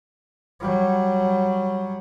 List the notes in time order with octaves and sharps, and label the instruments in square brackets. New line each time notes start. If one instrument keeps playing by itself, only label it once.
[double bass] F#3 G3